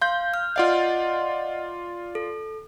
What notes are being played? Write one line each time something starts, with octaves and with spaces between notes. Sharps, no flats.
F5 C6 G6
F6
F4 D5 D#5 F5 F#5
A4